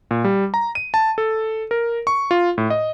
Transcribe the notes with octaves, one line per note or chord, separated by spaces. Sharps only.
A#2
G3
A#5
D#7
A5
A4
A#4
C#6
F4
A2
D#5